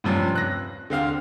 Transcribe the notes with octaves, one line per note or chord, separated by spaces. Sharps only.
G2 C3 F3 C#4
F#6 A#6
D3 C4 F5 F6